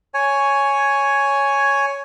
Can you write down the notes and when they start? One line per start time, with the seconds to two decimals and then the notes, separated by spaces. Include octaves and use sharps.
0.14 C#5 G#5